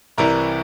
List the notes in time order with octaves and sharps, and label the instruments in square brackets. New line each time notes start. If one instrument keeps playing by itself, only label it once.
[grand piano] C2 C3 E3 G3 A#4